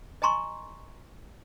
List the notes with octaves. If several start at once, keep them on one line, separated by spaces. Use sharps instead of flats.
D#5 G#5 A#5 C6 C#6